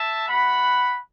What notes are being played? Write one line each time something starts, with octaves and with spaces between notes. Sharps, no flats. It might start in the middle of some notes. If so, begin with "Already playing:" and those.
Already playing: E5 A5
A3 F#4 F#5 B5